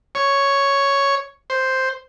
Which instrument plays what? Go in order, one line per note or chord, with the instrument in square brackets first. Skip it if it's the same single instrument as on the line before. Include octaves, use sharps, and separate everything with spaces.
[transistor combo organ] C#5
C5